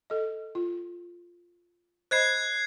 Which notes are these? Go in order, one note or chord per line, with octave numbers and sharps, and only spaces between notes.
A4 D#5
F4
C5 D#5 B5 F#6 G#6 C7